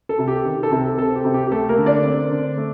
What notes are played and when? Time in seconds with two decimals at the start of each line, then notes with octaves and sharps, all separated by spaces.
0.09 A4
0.19 C3
0.28 G4
0.45 D#3
0.63 A4
0.72 C3
0.98 C4 A4
1.15 G4
1.25 C3
1.34 G4
1.47 G4
1.52 A3 A4
1.69 A#3 A#4
1.78 D3
1.86 D4 D5
2.04 C4
2.31 D3
2.57 A3